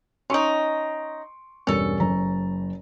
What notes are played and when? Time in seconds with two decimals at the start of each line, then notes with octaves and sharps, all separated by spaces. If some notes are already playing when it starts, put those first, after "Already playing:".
0.30 C#4 D#4 C6 C#6 D7
1.67 E1 G2 C#4 A4 A#4
2.00 F#1 A#5